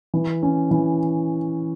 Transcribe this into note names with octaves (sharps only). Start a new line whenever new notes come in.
E3
C#4
E3